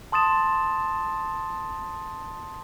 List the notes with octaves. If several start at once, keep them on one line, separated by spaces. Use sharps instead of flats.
A5 C6 D#6 A6 E7